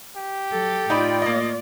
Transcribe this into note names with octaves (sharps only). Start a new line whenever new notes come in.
G4
F#3 A4
A2 D#4 F4 D5 G5 B5
A#3 D#5